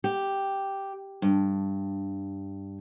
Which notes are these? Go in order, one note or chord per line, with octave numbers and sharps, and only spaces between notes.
G4
G2